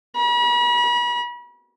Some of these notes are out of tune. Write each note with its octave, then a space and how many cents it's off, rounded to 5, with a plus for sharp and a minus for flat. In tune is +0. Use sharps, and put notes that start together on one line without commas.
B5 -40